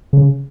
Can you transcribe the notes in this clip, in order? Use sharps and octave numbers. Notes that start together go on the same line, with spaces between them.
C#3